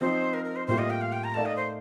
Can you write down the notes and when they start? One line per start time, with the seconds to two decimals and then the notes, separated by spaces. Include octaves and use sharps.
0.01 F3 C4 D#4 C5
0.34 A#4
0.45 A#4
0.56 C5
0.67 A2 G3 A#3 F4 C5
0.78 D#5
0.90 G5
1.01 F5
1.12 G5
1.24 A#5
1.34 A3 D#4 A#4 D5 F5 A5
1.45 D#5
1.56 C5